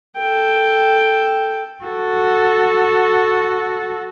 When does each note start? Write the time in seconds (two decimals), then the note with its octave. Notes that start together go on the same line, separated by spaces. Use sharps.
0.17 A4 G5
1.84 F#4 A4